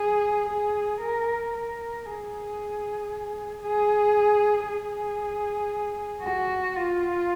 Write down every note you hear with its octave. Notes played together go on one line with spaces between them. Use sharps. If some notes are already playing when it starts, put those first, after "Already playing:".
Already playing: G#4
G#4
A#4
A#4
G#4
G#4
G#4
F#4
F4